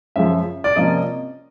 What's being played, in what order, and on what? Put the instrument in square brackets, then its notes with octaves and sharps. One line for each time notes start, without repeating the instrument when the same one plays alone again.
[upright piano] F#2 C#3 F3 E5
D5
C3 F3 A#3 C#4 D#5